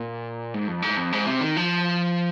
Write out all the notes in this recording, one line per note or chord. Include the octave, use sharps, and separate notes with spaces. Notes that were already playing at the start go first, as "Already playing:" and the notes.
Already playing: A#2
G#2
F2
G#2
F2
G#2
C3
D#3
F3